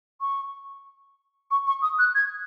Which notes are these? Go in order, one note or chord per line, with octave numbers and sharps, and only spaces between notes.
C#6
C#6
C#6
D#6
F#6
G#6